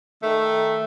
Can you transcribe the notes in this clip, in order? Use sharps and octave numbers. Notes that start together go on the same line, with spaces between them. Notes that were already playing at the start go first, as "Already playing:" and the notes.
D#3 A3